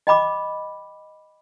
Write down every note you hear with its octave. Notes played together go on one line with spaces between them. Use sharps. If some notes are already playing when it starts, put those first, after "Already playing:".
D#5 G5 B5 D6